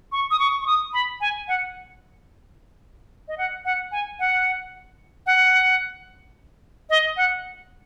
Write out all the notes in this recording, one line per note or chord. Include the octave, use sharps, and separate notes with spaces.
C#6
D#6
C#6
C#6
D#6
B5
G#5
F#5
D#5
F#5
F#5
G#5
F#5
F#5
D#5
F#5